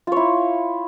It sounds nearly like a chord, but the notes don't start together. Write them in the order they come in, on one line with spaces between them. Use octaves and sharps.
F4 C#5 E4